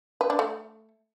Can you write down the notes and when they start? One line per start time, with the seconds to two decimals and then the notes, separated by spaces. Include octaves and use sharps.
0.21 B4
0.30 D4
0.39 A3